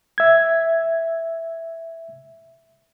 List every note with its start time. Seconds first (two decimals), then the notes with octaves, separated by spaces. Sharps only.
0.18 E5 G#6